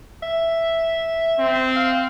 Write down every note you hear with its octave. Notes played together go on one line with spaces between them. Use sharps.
E5
C4
F5